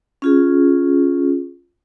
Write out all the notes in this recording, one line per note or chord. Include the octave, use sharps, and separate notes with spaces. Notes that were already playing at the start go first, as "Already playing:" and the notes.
C#4 F4 G#4